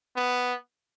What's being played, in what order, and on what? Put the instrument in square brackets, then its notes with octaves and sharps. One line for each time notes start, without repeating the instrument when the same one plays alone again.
[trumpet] B3